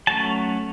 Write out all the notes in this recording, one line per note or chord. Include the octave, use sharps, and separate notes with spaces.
F#3 A3 C#4 A5